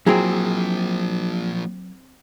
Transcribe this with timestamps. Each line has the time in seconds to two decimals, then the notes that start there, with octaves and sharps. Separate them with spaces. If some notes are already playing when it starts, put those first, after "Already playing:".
0.07 F3 F#3 A#3 C4 E4 G#4 A#5